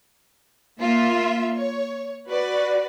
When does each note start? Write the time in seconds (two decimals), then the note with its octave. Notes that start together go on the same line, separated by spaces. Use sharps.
0.80 A#3 F4 E5
1.55 C#5
2.28 F#4 B4 D5